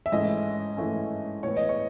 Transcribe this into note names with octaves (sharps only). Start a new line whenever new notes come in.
E5
G#2 E3 A3 C#4 D#5
G#2 E3 A3 C#4
A2 E3 B3 C#5
D#5
C#5